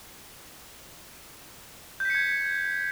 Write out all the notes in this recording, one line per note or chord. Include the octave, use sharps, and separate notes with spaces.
G6 G#6 B6 C#7